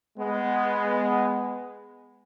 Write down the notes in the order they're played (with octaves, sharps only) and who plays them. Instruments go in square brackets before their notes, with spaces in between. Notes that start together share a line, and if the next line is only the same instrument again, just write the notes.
[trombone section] G#3 B3